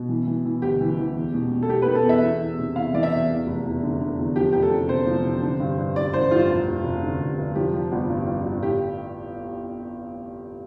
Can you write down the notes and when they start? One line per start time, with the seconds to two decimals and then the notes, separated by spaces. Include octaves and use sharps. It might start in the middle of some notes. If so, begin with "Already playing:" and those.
Already playing: B2
0.09 E3
0.27 E3
0.45 E3
0.62 D2 G4
0.81 E3
0.99 E3
1.16 E2
1.34 B2
1.51 B2
1.63 A4
1.69 B2 G4
1.82 B2 B4
1.95 A4
2.05 E2 E5
2.23 E2
2.41 E2
2.58 C3
2.76 E2 F5
2.94 E3 D5
3.03 E5
3.12 E2
3.30 E2
3.47 F1
3.65 E2
3.83 D3
4.00 D3
4.19 E2
4.36 F3 G4
4.53 F1 G4
4.63 A4
4.71 C3
4.89 C3 C5
5.06 F3
5.25 C3
5.42 D3
5.60 G2
5.78 G2
5.96 G2 D5
6.13 A1 C5
6.31 G2 F4
6.50 F1
6.67 F1
6.84 F1
7.02 D3
7.21 F1
7.38 F1
7.55 F3 G4
7.73 F3
7.92 G1
8.09 G2
8.26 G2
8.45 G1
8.62 A2 G4